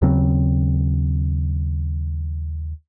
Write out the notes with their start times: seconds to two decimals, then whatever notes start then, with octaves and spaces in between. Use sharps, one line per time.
0.02 D#2 C#3 F#3 C4